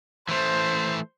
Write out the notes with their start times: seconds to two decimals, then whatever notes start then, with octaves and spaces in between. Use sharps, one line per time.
0.29 E3 A3 C5